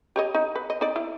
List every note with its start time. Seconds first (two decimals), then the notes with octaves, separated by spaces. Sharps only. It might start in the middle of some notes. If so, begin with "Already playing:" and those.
0.16 G4 C#5 D#5
0.34 D#4
0.56 B4
0.70 D#5
0.81 D#4 D5
0.96 E4